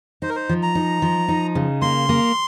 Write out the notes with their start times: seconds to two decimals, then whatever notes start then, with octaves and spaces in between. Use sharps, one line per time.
0.22 D#4 C5
0.29 A#4
0.36 C5
0.49 F3
0.63 A#5
0.75 D#4
1.02 F3
1.28 D#4
1.55 C#3
1.82 A#3 C6
2.09 A#3